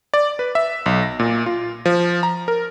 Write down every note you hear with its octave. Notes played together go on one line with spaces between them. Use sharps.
D5
B4
E5
B1
A#6
A#2
F4
F3
A#5
A#4